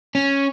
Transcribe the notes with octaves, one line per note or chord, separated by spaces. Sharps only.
C#4